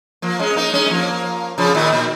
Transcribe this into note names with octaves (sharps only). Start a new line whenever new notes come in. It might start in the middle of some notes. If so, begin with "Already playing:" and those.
F3 A#3
G#3 C#4
A#3 D#4
G#3 C#4
G#3
F3 A#3
C#3 F3
A#2 D#3
A#2